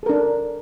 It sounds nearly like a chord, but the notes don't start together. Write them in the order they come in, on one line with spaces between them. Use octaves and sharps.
A4 A#4 D4